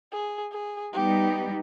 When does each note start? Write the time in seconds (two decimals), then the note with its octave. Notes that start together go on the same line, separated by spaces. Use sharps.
0.12 G#4
0.52 G#4
0.93 G3 B3 D#4 G4